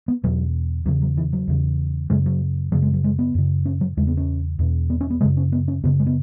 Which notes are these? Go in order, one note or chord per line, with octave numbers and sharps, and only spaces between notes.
B3
E2 B2 F#3
E2 C#3 F#3
F#3
E3
F#3
E2 C#3
F#2 C#3 G#3
F#3
F#2 C#3 F#3
G#3
F#3
G#3
B3
F#2 C#3
C#4
F#3
E2 C#3 G#3
B3
C#4
E2 B2
B3
C#4
B3
F#2 C#3 G#3
C#4
B3
C#4
F#2 C#3 B3
G#3
B3